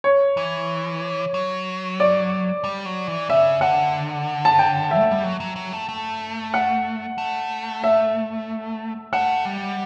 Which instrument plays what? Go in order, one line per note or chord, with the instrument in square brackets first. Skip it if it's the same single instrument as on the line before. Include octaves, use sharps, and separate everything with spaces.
[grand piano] C#5
[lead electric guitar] E3
F#3
[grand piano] D5
[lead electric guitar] G3
F#3
E3
[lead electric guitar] C#3 [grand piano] E5
[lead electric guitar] D3 [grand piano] F#5
[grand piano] A5
G5
E5
[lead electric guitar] A3
G3
F#3
F#3
F#3
A3
A3
[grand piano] F#5
[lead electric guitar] A3
[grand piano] E5
[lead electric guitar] A3 [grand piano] F#5
[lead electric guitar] G3